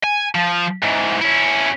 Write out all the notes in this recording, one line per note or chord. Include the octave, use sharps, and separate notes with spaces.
G#5
F3
G#2 E3
C#4 E4